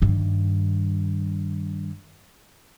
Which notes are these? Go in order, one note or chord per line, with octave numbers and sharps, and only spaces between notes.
G2 D#3